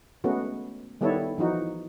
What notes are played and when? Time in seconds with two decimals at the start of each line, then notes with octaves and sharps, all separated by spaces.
0.24 G#3 A3 B3 C#4 F#4
1.01 D#3 G3 B3 E4 A4 C#5
1.38 E3 F3 D#4 F#4